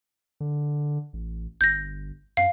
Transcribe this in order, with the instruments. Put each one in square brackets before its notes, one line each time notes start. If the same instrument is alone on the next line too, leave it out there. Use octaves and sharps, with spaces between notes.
[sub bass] D3
A1
[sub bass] G1 [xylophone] G6 A#6
[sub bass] F#2 [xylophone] F5